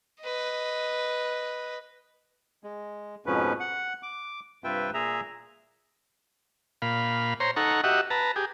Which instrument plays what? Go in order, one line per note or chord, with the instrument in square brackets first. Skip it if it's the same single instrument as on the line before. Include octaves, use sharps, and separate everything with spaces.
[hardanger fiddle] B4 D#5
[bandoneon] G#3
F2 G#2 B2 F3 C#4 B4
F#5
D6
G2 C3 F4 B4 E5 G5
A#2 G#4 E5 A#5
[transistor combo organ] A#2 F5 B5
C5 C#5 A#5 C6
D#4 A4 F#5 A#5 C#6
F#4 G4 D#5 E5 F#5
B4 A5 A#5
G4 G#4